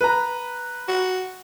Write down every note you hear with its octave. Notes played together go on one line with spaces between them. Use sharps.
B4 A#5
F#4